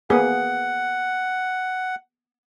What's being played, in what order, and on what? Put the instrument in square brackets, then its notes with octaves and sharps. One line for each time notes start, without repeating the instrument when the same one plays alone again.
[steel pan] A#3 B3 G#4 [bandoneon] F#5